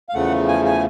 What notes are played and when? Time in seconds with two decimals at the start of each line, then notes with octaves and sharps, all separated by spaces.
0.09 F5
0.14 E2 C#3 F3 A3 F#5
0.48 G#5
0.65 G#5